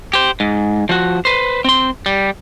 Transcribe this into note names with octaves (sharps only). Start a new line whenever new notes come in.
G4 C5
G#2
F3 F#4
B4 C5
C4 C6
G3